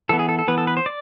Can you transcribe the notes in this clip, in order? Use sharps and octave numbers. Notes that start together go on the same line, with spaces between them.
E3 B3 A4
G#4
A4
A4
E3 B3 B4
A4
B4
C5
D5